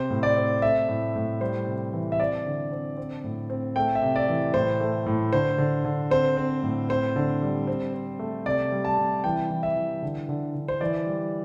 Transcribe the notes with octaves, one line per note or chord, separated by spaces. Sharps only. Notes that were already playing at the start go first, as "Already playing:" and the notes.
Already playing: C3 C4 C5
A2
D5
C4
A3 E5
A2
A2
G3 C5
C3
E3
E5
C4 D5
D3
C4
C4
A2
C4
A3 G5
E5
C3
D5
E3
A2 C5
A3
A2
D3 C5
D3
D3
C4 C5
C4
A2
C4 C5
D3
G3
C4
C4
A3
C3 D5
G3
A5
C3
E3 G5
E3
E5
E3
D3
D3
D3
C5
E3 D5
G3